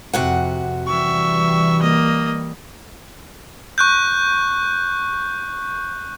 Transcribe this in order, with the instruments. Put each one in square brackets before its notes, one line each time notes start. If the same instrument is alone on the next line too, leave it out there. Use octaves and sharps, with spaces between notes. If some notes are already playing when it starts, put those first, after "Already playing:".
[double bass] F2 [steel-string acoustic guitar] C3 F#4 F#5
[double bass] E3 G3 [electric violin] E5 C#6
[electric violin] A#3 D#5
[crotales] C#6 F#6 G6